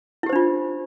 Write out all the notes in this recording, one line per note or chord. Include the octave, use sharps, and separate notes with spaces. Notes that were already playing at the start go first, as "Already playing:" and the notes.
D4 E4 F4 G4 C5